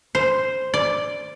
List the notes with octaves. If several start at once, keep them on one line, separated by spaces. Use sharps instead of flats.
C5
D5